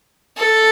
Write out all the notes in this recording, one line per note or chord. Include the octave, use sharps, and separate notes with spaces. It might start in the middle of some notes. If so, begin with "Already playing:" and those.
A4